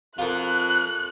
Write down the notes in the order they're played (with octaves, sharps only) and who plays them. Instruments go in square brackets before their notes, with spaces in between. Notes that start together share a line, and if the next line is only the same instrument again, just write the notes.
[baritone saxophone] F2 [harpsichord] F4 A#4 [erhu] F#6